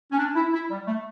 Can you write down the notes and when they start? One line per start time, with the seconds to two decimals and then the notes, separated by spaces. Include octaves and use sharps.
0.12 C#4
0.18 D4
0.35 E4
0.53 E4
0.70 G3
0.87 A3